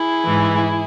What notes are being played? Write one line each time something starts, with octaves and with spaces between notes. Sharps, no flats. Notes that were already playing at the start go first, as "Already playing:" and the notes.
Already playing: E4 G#4
G#2 E3